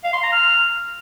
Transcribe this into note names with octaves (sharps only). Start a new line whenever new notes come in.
F5
C6
A#5
F6